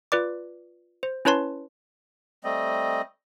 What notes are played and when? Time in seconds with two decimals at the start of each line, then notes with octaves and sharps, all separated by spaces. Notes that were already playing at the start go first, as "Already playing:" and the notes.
0.12 F4 B4 D5 D6
1.03 C5
1.25 C#4 E4 B4 C#5 A5 C6
2.44 G3 A3 C4 D#5